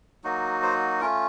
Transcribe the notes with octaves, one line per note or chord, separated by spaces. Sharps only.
F#3 A#3 D#4 F#4
C5
A3 C#4 F4 A#4